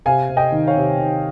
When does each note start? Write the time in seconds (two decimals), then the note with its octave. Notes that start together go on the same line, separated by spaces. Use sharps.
0.06 C3 F5 G#5
0.29 C3
0.37 D#5 G5
0.52 D#3
0.67 C#5 F5
0.76 C3
0.98 D#3